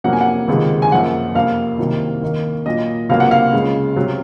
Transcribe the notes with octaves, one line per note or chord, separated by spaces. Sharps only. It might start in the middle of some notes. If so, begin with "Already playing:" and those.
F2 C3 F#3 A#3 F#5
G#5
F#5
C#2 C3 D#3 G#3
G#5
F#2 F3 A#3 F#5
F2 C3 F3 A#3 F5
C2 C3 D#3 F#3 A#3
D#2 D#3 A#3
A#2 F#3 A#3 D#5
C#2 C3 F#3 A#3 F5
F#5
F5
C#2 C#3 G#3
C3 F#3